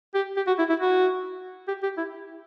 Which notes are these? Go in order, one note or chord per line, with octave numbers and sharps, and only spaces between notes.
G4
G4
F#4
E4
E4
F#4
G4
G4
E4